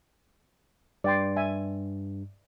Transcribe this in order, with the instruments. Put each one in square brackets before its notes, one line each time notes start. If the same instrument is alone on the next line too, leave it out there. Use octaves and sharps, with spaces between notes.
[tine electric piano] G2 [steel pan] D5 G5 C6
[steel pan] E5 G#5